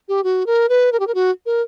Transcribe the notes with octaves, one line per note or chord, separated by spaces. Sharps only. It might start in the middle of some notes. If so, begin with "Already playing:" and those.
G4
F#4
A#4
B4
A#4
G4
A#4
F#4
A#4